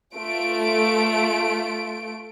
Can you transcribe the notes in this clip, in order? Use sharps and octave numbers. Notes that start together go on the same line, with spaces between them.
A3 F4 D7